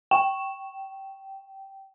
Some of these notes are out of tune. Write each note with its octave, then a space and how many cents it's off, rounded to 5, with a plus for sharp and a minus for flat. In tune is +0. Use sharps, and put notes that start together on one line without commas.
G5 -15